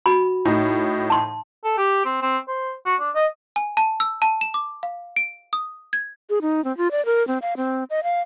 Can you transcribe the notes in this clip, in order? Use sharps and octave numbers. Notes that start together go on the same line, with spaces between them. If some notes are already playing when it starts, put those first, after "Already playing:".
F#4 B5
A2 D#4
A5 C6
A4
G4
C4
C4
C5
F#4
D4
D#5
G#5
A5
E6
A5
E7
D6
F5
D7
D#6
G#6
G#4
D#4
C4
F4
D5
A#4
C4
F5
C4
D#5
F5